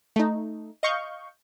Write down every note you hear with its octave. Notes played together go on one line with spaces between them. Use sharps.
A3 D#4
D#5 F5 C#6 G6